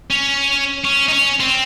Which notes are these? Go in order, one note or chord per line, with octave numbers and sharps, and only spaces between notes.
C#4
C#4
D#4
C#4
C4